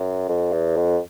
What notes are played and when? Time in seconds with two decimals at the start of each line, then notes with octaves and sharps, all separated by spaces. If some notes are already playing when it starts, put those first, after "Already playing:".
Already playing: F#2
0.28 F2
0.52 E2
0.77 F2